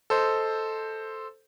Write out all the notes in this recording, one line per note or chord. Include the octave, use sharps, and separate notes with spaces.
A4 C5 D#5